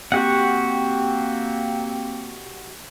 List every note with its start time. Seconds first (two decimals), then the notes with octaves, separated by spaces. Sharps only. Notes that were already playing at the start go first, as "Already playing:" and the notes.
0.12 A#3 C4 F#4 G4 F#5